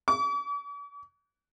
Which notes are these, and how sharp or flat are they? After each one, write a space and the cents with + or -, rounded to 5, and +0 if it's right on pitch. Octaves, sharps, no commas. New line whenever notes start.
D6 -45